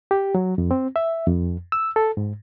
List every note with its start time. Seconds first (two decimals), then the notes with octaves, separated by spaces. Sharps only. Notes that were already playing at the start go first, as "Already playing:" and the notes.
0.11 G4
0.35 F#3
0.58 F2
0.71 C4
0.96 E5
1.27 F2
1.72 E6
1.96 A4
2.17 G#2